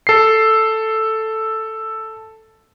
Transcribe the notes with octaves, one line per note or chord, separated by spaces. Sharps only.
A4 C7